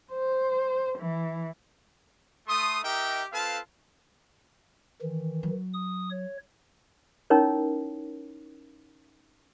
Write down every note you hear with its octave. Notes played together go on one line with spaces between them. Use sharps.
C5
E3
A3 C6 D#6
D#4 G4 A#4 D#5 E5 G5
C4 F4 A4 B4 F5 A5
D#3 E3
F#3
D#6
C#5
C#4 D#4 E4 A#4 C#5